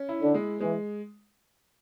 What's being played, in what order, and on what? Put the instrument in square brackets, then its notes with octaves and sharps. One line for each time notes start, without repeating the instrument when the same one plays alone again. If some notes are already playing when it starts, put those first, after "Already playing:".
Already playing: [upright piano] C#4
E4
[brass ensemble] D3
[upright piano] G#3
[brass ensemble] E3 [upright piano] G#3